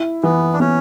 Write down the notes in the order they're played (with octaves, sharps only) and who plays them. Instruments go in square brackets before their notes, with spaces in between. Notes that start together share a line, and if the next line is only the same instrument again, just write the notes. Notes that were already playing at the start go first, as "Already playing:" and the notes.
Already playing: [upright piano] E4
[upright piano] E3 [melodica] B3
[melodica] D4
[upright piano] B3 [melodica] C#4